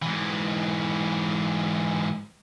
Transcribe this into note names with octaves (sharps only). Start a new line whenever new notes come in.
G#2 E3